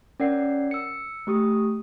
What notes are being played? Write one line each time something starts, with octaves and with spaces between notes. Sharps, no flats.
C#4 A#4 D5 F#5 C7
E6 C#7
A3 G4 D#6